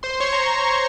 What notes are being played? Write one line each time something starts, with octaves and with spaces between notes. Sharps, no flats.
C5 C6
C#5 C#6
A#5